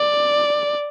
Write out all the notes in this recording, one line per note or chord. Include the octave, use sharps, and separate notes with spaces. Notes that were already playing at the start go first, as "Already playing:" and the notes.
Already playing: D5